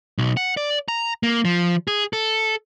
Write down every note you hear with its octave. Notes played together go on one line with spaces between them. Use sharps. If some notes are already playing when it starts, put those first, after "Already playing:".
B1
F#5
D5
A#5
A#3
F3
G#4
A4